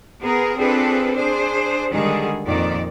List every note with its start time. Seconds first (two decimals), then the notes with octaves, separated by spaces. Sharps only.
0.22 B3 G#4 A#4
0.57 C4 D4 F4 G#4 A4 B4
1.13 D4 G#4 C5
1.92 D3 D#3 G3 G#3 G#4
2.46 F2 A#2 D#3 D5